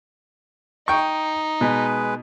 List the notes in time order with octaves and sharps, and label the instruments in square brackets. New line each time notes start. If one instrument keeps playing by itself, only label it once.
[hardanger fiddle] D#4 [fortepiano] G5 C#6
[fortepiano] B2 [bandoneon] G#3 B4